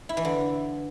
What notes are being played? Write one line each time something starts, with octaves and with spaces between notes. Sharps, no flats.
E4
E3
D3